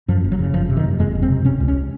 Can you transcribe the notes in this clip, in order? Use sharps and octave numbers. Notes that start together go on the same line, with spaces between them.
F#2 F3
F#1
F#3
C#3
F#1 F3
C3
D#3
F#1
F2 G#3
F#1
C4
C3
C3 C#4
C#2
C#4